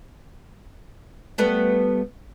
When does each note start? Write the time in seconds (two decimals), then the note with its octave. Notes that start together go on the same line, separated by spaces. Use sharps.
1.38 G3 A3 B3